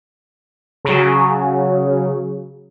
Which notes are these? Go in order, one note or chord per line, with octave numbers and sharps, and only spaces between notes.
C#3 F#3